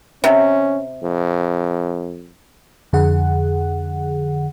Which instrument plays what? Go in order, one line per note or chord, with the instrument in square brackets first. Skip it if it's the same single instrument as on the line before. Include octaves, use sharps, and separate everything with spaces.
[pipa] C3 [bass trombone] C#4
[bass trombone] F2
[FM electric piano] F2 D3 G#4 F#5